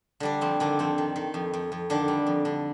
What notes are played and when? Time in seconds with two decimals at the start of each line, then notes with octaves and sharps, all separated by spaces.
0.20 D3 G3 D4
0.41 F2 C4
0.60 D3 D#3 D4
0.79 F2 C4
0.98 D#3
1.16 D#3
1.34 F2
1.53 F2
1.72 F2
1.90 D3 D#3 D4
2.08 G3
2.27 F2
2.45 D3